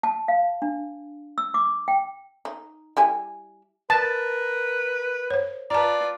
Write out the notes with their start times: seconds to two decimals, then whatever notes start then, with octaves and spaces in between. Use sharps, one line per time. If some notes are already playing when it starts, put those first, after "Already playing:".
0.03 A5
0.28 F5
0.62 D4
1.38 E6
1.54 D6
1.88 G5
2.45 D#4
2.97 G3 E4 G#5
3.90 A#4 B4 A5
5.30 C5 C#5
5.70 F4 B4 D5 A5 A#5